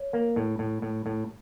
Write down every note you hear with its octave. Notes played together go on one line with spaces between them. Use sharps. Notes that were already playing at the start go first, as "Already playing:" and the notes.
Already playing: C#5
A#3
A2
A2
A2
A2